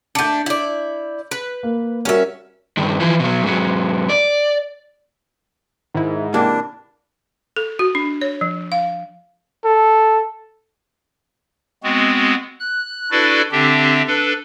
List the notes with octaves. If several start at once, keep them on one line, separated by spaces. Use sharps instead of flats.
A3 D4 G6 C#7
E4 D5
B4
A#3
G3 C#4 F#4 A#4 E5
G2 D#3
E3 F3
B2 F#3
G#2 F#3
D5
G#2 D#3 E4
C3 E3 A#3 D4 G4
A4
F#4
D4
C#5
F3
F5
A4
G#3 B3 C4 F#4
F#6
D4 E4 F#4 A4 B4 D5
D3 C4 D4 G4 E5
D4 A4 B4